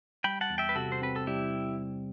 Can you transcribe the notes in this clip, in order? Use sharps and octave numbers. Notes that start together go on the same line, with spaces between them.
G3 G5 B5
F#5 A5
E2
E5 G5
B4
C3 F#4 A4
C5
C4 B4
A4
G3 E4 G4